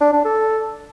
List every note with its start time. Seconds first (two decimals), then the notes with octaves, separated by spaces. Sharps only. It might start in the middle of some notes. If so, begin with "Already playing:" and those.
0.01 D4
0.13 D4
0.25 A4